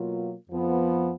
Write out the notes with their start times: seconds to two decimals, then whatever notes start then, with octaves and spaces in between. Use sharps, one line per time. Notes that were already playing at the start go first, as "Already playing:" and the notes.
Already playing: B2 F#3 A#3 F4
0.49 F2 F3 B3